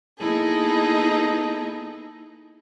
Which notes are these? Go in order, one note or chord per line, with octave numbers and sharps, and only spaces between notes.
A#3 B3 D#4 E4 G#4 A4